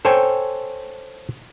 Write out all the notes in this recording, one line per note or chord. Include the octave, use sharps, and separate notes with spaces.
A4 C5 C#5 G5 G#5